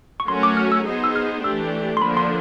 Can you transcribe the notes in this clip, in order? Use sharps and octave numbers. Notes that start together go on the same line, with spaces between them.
C#6
F#3 A3 C#4 F#4 A#4 C6
D6
F6
E6
B3 D#4 G#4 C5
E6
F6
E3 A3 D4 G4 E6
C6
D3 F3 A#3 D4 B5
C6